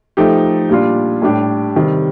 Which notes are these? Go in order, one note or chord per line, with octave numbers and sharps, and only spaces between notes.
F3 A3 D#4 G4
A#2 G3 D4 F4
A2 G3 D4 G4
C3 D#3 G3